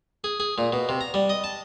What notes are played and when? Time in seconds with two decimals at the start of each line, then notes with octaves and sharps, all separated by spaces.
0.24 G#4
0.40 G#4
0.58 A#2
0.73 B2
0.89 C3
1.01 A#5
1.14 G3
1.29 D#5
1.44 A5